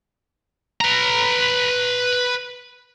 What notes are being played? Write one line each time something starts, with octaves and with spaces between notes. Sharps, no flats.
B4 A#5